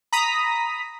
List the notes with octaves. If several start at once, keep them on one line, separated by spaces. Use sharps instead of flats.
A#5 B5 D#6 B6